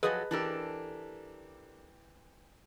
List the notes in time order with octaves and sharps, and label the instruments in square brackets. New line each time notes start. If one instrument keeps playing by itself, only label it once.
[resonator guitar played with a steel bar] F3 F#3 A4 [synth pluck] G#4 [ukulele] B4 D#5
[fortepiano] E3 G4 E6 [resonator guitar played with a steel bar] D4 A4 A#4